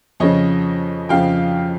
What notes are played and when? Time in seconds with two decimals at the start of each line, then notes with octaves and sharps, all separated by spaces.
0.20 F2 C#3 F3 C#5 D#5
1.09 F2 C#3 F3 F5 G5